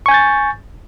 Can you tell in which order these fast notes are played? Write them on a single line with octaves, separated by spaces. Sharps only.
C#6 G#5 G6 A6